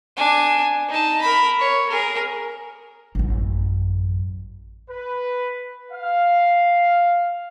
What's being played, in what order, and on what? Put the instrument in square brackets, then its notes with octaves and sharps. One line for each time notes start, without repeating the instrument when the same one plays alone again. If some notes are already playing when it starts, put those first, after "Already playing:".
[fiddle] D4 G#5
D#4 A5
A#4 B5
C#5
G#4 A#4
[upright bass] A1 F#2
[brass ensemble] B4
F5